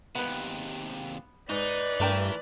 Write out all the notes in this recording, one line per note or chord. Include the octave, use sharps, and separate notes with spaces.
D#2 C3 B3 B4
G#2 D#4 B4 D5
G2 E3 A3 A#4 G5